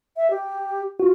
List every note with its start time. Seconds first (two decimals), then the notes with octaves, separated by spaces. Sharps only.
0.17 E5
0.31 G4
1.00 F4 F#4